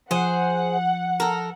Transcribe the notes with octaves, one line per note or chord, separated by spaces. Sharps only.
F3 G#4 C5 F#5
A4 A#4